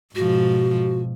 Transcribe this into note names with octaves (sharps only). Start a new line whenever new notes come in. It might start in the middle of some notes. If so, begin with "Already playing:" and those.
G#2 B2 F3 F#4